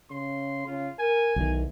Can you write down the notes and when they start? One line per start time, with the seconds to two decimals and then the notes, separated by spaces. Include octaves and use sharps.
0.10 C#3 C6
0.67 C#3 F4
0.99 A#4 G#5
1.36 B1 E2 D#3